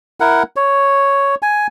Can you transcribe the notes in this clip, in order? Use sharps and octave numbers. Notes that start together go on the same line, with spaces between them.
E4 A#4 F#5
C#5
G#5